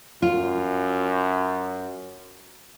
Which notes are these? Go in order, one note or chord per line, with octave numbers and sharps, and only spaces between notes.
F#2 F4